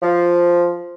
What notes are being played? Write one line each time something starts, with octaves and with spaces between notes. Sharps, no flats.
F3